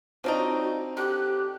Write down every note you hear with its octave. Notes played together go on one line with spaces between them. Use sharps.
F3 C4 D4 D#4 F#4 C#5 D5
D3 G4 F#6